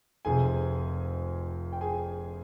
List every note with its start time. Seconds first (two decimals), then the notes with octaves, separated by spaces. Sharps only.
0.25 F1 F2 C3 G#4 G#5
1.73 G5
1.81 G#4 G#5